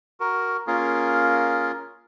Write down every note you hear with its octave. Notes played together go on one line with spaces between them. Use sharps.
F#4 A#4
A#3 C#4 F4 G#4 A#4